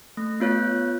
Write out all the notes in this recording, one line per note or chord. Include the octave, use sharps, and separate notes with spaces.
A3
B3 F4 C#5 F#6